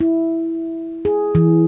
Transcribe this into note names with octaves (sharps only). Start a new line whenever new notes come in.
E4
G#4
E3